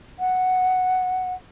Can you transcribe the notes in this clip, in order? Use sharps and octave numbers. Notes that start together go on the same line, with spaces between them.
F#5